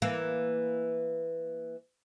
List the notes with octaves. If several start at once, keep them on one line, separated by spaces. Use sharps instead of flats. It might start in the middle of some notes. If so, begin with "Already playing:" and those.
E3 A#3